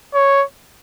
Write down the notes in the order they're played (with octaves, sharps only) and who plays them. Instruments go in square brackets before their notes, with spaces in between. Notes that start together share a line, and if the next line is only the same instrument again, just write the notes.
[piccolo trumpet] C#5